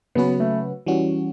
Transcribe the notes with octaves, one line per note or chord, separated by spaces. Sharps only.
C#3 F#3 B3 C#4 F#4 B4
A3
E3 G3 C#4 F#4